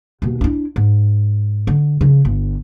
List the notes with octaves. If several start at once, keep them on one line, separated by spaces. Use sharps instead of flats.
D#2 B2
D4 E4
G#2
D3
C#3 F3
G1